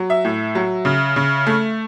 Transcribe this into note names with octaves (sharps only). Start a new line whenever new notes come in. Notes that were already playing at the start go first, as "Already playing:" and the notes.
Already playing: F#3
E5
A2
F#3
C#3
C#3
A3